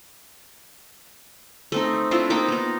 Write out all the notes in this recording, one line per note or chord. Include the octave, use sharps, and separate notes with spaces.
A3 C4 D#4
C4 D4 E4 F4
A#3 D#4 G5 D6
B3 D#4